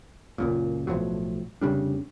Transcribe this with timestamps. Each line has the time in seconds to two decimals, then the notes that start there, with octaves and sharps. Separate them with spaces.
0.38 C#2 F#2 A#2
0.87 B1 A2 F3 F#3
1.61 F1 C#3 G3 D4